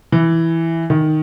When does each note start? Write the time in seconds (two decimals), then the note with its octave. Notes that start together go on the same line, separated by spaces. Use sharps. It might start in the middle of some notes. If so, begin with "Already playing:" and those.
0.12 E3
0.90 D#3